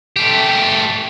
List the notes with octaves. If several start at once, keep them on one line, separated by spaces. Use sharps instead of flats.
A3 G4